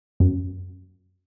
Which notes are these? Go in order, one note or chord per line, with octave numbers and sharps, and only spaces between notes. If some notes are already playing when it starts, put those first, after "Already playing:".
F#2